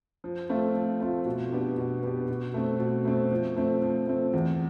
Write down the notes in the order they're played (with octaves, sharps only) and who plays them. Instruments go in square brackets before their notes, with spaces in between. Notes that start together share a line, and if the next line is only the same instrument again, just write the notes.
[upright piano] F3
A3 C4 F4
F3
A3 C4 F4
B2
B3 D4 G4
B2
B3 D4 G4
B2
A3 C4
B2
A3 C4
F3
A3 C4
F3
A3 C4
E2